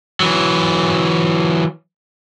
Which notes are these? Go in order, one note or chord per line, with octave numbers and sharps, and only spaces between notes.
E3 F#3